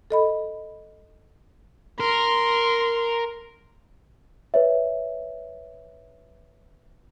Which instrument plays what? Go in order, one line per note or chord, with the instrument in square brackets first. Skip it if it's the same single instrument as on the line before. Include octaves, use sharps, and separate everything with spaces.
[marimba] A4 D#5 B5
[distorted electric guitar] A#4 [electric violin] C6
[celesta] B4 C#5 E5